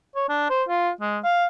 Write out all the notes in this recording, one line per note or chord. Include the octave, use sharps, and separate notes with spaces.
C#5
D4
C5
F4
G#3
F5